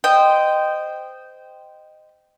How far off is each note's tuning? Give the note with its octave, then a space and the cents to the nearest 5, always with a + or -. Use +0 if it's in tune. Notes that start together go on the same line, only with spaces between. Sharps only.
C5 -15 D#5 -10 G5 -5